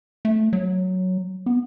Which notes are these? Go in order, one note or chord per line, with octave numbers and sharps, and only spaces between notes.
A3
F#3
B3